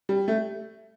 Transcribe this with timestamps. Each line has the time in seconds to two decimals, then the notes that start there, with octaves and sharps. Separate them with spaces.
0.09 G3
0.28 A3